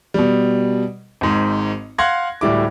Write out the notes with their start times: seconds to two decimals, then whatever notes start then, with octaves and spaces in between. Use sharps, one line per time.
0.14 B2 G3
1.21 G#1 G#2
1.98 F5 F#5 C6 F#6 G#6 A#6
2.41 D1 A2 G3 E4 D6